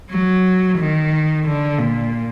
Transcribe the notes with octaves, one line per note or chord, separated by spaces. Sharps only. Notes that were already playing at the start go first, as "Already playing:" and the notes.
F#3
D#3
D3
A#2